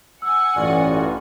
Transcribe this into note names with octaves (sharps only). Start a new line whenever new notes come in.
F#5 G#5 E6
A1 G2 F4 F#4 D5 F6